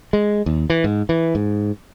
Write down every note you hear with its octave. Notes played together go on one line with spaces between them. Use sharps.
G#3
D#2
E3
G#2
E3
G#2